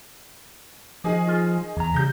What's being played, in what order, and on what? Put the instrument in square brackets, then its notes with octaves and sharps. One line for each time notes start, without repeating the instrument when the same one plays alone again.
[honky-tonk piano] D#3 G#4 D#5 [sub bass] F3
[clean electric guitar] F4
[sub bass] E2 [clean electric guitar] E3 A#5
[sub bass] C#3 [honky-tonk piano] G3 G6 A#6